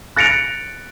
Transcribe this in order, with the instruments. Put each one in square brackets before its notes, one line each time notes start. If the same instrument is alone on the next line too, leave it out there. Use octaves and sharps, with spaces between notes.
[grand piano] F#6 A6 A#6 C#7 D7 F7